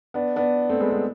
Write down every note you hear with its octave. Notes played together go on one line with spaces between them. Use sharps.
B3 D4
B3 D4
A3 C4
G#3 B3
G#3 B3